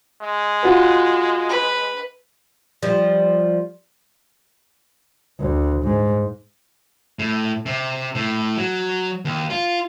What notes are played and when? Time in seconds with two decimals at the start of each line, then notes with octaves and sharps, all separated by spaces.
0.21 G#3
0.63 F4 F#4 B4
1.49 B4
2.83 F3 G3
5.40 D2
5.84 G#2
7.19 A2
7.66 C3
8.15 A2
8.57 F#3
9.25 D#2
9.50 F4